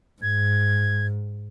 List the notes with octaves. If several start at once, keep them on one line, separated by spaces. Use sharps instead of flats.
G#2 G#6